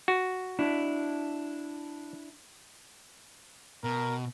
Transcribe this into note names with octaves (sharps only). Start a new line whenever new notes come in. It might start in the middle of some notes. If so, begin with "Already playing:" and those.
F#4
D4 E4
B2 A#4